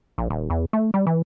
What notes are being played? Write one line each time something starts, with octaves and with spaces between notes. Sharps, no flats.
A#1
D#1
E2
A3
G3
E3